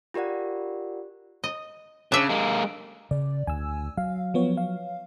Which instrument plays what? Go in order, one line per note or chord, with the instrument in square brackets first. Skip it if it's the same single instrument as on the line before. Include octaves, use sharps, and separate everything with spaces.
[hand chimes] F4 G4 A#4 D5 F#5
[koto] D#5
[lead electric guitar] C#3 [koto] D4 E5
[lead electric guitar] G#3 A#3
[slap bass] C#3 [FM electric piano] D5
[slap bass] D2 [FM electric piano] G#5 E6
[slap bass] F#3 [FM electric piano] F5
[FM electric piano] F3 B3 C#5
F5